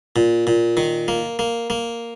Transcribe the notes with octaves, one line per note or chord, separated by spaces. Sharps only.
A#2
A#2
D#3
A#3
A#3
A#3